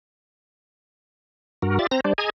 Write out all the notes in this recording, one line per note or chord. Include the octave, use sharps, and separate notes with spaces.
G2 F#4 A#4
F4 G4 D5 E5 A6
C4 C5 A#5 A#6
G3 D4 C5 D5
G#4 D#5 G#5 A#5 G#6